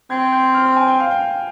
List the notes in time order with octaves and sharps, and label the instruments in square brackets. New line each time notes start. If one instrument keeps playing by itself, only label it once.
[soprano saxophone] C4 [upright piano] G#6
[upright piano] G6
F6
G#5
G5
F5
G5